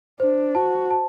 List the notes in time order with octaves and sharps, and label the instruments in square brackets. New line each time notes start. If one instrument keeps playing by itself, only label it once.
[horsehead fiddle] D4 [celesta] C5
[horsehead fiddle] F#4 [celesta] A5
[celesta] A5